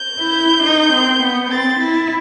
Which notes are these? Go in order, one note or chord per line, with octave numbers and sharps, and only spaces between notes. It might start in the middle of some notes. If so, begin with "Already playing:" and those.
Already playing: G6
E4
D#4
C4
B3
C4 A6
E4